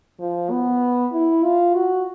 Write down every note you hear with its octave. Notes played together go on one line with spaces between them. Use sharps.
F3
B3
E4
F4
F#4